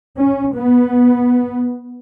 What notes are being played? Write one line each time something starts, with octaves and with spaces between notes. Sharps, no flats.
C#4
B3